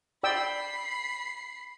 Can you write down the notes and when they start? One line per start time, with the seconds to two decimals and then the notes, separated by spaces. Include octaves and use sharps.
0.23 D5 G5 B5 E6 C7